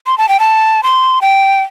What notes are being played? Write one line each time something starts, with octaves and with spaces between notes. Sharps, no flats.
C6
A5
G5
A5
C6
G5